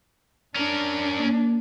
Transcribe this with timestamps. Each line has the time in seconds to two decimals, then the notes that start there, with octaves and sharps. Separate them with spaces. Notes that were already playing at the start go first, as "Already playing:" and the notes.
0.55 C#4 D4 A#4
1.19 A#3